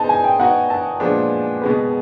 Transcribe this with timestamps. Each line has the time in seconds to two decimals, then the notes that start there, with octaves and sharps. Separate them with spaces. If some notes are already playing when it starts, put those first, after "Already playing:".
Already playing: B3 D#4 G#4 C5 D#5 A5
0.09 G#5
0.24 G5
0.39 B3 D#4 F#4 F#5
0.70 A5
1.00 A#2 F3 G#3 B3 D4
1.61 B2 G#3 B3